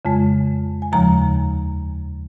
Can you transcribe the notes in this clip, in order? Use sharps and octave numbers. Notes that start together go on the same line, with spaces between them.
F2 C#3 G#3
G#5
D#2 C#3 F3 G#3 A#5